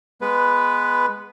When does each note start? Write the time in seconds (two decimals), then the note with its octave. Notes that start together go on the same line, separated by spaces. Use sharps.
0.21 G#3 B3 B4